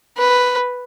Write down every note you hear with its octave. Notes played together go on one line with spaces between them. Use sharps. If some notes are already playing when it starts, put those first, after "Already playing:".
B4